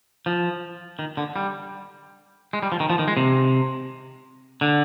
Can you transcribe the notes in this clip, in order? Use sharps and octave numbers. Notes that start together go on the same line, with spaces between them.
F3
D#3
D3
G3
G#3
G3
F3
D#3
F3
D#3
G#3
C3
D3